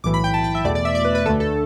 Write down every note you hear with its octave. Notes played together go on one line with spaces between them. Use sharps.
B1 A2 E3 D6
B5
G5
A5
G5
E5
E2 B2 A3 D5
D5
E5
D5
B4
B4
D2 D3 A3 A4
A4